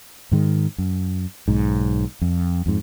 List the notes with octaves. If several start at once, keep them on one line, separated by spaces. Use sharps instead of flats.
G#2 D#3 G#3
F#2
B1 G#2
F2
F2 G#2